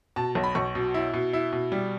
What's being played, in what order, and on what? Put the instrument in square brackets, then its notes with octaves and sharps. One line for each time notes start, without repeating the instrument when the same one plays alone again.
[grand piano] B2 A5
B1
B5
B1 C#6
B2
E4
B2
E4
B2
G3